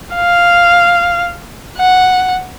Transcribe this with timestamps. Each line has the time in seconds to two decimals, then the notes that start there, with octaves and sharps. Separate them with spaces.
0.15 F5
1.78 F#5